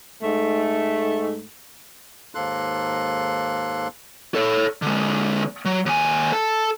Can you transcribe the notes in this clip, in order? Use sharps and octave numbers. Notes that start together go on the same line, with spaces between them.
G#2 A3
D#2 G#2 A#3 A4 C6 F#6
A4 C#5
D3 G#3
F#3
D#2 G#5
A4 A5